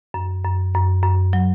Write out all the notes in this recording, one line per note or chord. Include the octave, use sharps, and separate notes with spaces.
F#2
F#2
F#2
F#2
F#3